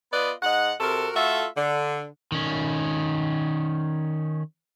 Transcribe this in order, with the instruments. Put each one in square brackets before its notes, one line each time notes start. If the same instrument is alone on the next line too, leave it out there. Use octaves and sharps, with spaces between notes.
[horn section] B3 F4 B4 D5 D#5
G#2 D#5 F#5
C3 F#4 A4 A#4
A3 F4 F#4 A4 E5
D3
[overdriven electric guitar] D#3 C#4